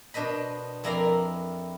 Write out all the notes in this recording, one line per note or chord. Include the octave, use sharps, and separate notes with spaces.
B2 D4 C5 D#5 B5
F2 E4 A#4 D5 A#5 C6